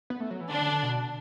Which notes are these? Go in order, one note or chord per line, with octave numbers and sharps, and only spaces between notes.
B3
A3
F#3
E3
D3 D4
D3
D3
B2